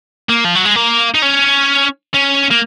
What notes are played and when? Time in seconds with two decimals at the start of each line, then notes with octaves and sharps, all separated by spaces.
0.30 A#3
0.45 F3
0.56 F#3
0.65 G#3
0.76 A#3
1.15 D#4
1.22 C#4
2.14 C#4
2.51 A#3